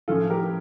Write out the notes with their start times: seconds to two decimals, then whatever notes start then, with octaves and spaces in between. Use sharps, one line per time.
0.08 A2 F3 C#4 F4 A4
0.30 G4 A#4